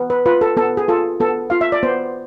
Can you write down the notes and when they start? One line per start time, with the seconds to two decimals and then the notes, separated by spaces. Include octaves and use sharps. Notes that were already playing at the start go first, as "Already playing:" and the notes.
Already playing: B3
0.10 B4
0.26 F4 B4
0.41 A4
0.57 B3 A4
0.77 G#4
0.88 F4 A4
1.20 B3 A4
1.50 F4 F5
1.61 E5
1.72 D5
1.83 B3 C5